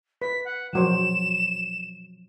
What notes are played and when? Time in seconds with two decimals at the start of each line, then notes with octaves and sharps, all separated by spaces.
0.22 B4 B6
0.45 F#5
0.73 F3 F#3 C5 E7